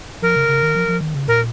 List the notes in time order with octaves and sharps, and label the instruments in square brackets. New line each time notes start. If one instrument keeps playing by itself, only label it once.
[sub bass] F3 [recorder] A#4
[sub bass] C#3
C#3
D#3
F3
F3
D#3
C#3
[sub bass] A#2 [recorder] A#4